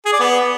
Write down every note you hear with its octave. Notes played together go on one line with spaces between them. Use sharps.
G#4
D5
B3